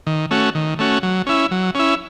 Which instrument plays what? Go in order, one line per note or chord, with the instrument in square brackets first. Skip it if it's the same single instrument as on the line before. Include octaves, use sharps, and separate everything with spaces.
[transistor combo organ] D#3
A3 C#4 F#4
D#3
A3 C#4 F#4
F#3
C#4 E4
F#3
C#4 E4